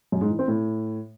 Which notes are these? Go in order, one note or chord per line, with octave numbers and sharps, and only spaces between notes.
F#2
G#2
E3
C4
A2